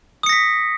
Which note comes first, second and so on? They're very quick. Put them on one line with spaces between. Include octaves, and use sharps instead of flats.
D#6 C#7 A#6 B6